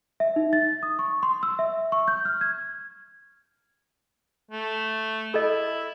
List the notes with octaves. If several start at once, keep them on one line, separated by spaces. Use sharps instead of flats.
E5
D#4
A6
D#6
C#6
C6
E6
E5
C#6
G6
F6
G#6
A3
E4 A4 D#5